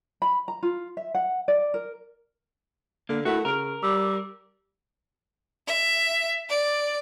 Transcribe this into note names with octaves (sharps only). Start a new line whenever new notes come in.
B5
A#5
F4
E5
F#5
D5
A#4
D3 A#3
A3 E4 F#4 A#4 F#5
C#3 A#4 F6 D7
G3 D6 E6
E5
D5